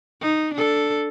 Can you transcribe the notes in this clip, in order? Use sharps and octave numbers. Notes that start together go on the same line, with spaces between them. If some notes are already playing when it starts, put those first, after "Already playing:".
D#4
D4 A4